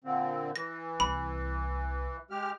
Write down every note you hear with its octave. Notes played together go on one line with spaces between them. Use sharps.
A#2 D3 C4
E3 A#6
C2 B5
G#3 G4 F6